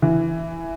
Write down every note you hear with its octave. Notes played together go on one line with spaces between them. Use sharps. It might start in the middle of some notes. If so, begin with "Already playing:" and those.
E3